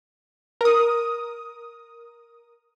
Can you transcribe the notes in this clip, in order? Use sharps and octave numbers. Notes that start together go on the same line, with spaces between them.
A#4 D#6